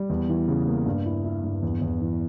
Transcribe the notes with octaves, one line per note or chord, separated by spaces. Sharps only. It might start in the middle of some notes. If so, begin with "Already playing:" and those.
Already playing: G3
E2
E3
C#3
A#3
G2
E4
E4
G2
E2
E2
E3